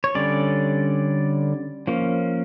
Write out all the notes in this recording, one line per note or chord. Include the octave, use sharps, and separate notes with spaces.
C#5
D3 G3 C#4 D5
F3 A#3 C#4